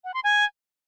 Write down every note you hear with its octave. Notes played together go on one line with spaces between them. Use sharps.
F#5
C6
G#5